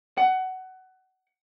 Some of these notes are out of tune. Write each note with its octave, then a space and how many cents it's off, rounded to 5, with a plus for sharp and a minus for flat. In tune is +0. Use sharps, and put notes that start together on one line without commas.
F#5 +20